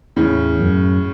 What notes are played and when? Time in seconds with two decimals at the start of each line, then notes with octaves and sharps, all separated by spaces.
0.16 E2 A2 C#3
0.60 F#2